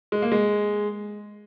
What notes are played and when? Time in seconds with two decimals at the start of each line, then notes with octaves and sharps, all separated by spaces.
0.12 G#3
0.22 A#3
0.32 G#3